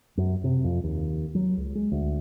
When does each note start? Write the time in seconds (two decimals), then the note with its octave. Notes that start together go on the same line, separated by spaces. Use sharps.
0.17 F#2
0.44 C3
0.64 F2
0.84 D#2
1.35 F#3
1.57 C#2
1.75 G#3
1.92 D2